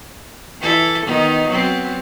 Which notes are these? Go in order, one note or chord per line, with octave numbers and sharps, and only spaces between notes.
E3 E4 A4
D#3 B3 D#4
F#3 B3 C4